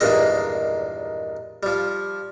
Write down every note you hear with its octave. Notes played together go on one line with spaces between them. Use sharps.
E2 G2 A#2 D#3 G#3 D#5
F3 G3